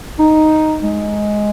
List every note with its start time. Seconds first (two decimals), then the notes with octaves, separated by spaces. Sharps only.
0.19 D#4
0.83 G#3